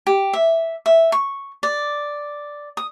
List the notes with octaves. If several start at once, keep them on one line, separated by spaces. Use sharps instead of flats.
G4
E5
E5
C#6
D5
D#6